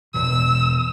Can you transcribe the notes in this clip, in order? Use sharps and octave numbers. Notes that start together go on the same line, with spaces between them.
E1 B2 E3 E6